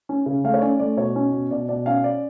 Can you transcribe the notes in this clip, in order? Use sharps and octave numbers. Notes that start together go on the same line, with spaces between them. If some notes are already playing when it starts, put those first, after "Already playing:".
C#4
C#3
A3 F5
C#5
C#4 D5
A3 D5
B2 C#5
C#4
B2
B2 D5
B2 D5
C#4 F5
D5